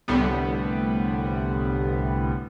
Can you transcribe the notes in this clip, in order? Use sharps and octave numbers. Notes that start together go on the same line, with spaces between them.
C2 A2 D3 G3 B3